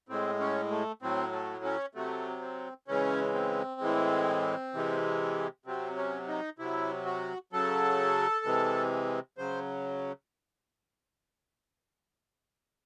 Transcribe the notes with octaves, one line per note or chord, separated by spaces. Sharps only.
A2 G#3 C4
C#4
A3
A2 F#3 C4
A3
C#4
C3 F#3 A3
C4
C#3 E3 G#3 C#4
C4
A2 E3 G#3
C3 E3 G#3
C3 F#3 C4
C#4
D#4
C3 F#3 E4
F#4
C#3 F#3 A4
C3 E3 G#3
C#3 F#3 C5